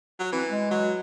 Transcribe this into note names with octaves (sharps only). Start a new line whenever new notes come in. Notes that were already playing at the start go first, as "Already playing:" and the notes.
F#3
E3 C4
G#3
F#3